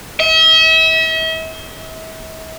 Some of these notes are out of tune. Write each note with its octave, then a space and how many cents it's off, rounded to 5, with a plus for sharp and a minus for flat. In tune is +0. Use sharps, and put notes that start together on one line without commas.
E5 -40